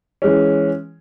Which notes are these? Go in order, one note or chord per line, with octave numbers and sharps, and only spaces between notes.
E3 G#3 C#4